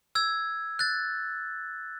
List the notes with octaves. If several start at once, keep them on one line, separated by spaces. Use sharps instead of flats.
E6 G#6
F#6 A6